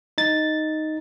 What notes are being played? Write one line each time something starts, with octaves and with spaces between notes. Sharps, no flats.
D#4 A6